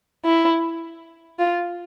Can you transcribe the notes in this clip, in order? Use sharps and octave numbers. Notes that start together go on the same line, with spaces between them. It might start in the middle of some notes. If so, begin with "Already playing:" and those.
E4
F4